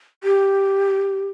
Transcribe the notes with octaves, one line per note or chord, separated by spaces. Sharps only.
G4